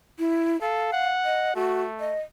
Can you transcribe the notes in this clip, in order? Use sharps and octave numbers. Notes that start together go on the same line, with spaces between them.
E4
A4 F5
F#5
D#5
A3 F#4
D#5